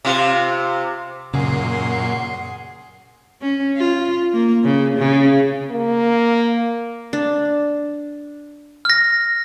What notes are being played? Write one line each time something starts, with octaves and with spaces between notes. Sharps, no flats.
C3 F4
F#2 A#2 C#3 G#4 F#5 C6
C#4
F4
A#3
C#3
C#3
A#3
D4
F6 A#6